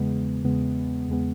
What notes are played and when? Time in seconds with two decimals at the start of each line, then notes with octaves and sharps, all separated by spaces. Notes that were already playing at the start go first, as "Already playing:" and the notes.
Already playing: E2 C#3 G#3 B3
0.44 E2 C#3 G#3 B3
1.08 E2 C#3 G#3 B3